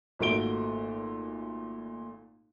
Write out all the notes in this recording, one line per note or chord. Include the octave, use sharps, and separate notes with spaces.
G#1 A#2 A3 F#4 D7 G7